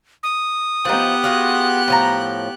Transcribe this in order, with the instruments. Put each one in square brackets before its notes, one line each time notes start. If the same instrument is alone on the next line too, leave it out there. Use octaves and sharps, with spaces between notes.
[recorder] D#6
[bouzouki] F3 D#4 [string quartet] B3 G4 F#6
[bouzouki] F4 F#4 G#4
A2 F3 A#5